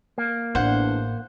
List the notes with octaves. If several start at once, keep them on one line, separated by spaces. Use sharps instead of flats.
A#3
A1 E2 D4 C5 F#5